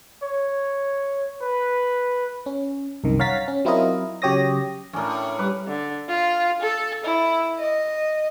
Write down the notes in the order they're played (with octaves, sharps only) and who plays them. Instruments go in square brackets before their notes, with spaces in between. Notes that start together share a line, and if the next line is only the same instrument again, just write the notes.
[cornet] C#5
B4
[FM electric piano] C#4
C2 F#2 D#3
C#5 F5 F#5 A#5 A6 B6
C#4
F#3 C4 E4 F4 A#4 D#5
C#3 F#3 G4 C#5 D#6 A#6
[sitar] F#2 A2 [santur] C#4 D4 A#4
[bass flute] G3 [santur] B4 D6 D#6
[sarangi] D3
F4
A4
E4
D#5